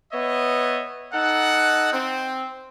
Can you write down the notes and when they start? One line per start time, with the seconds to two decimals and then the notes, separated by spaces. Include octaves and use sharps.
0.12 B3 C#5 D#5 E5
1.13 D#4 A4 F#5
1.93 C4